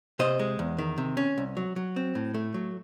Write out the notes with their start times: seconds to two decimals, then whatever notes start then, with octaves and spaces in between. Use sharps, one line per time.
0.19 C3 C5 D#5
0.39 G#3
0.59 E2
0.78 D#3
0.98 C3
1.17 C#4
1.38 C2
1.57 F#3
1.76 F#3
1.96 C4
2.15 A2
2.34 A3
2.54 F#3